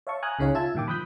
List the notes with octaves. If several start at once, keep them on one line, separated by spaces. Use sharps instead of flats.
C#5 E5 F5 A5 C#6
G#5 A#5 D#6 F6 F#6
C#2 C#3 D#4 C#5 F5 G#5
F4 E5 A5 E6 G#6
G2 A#2 D#3 G5 D6
F3 B5 D#6 F#6 G6 B6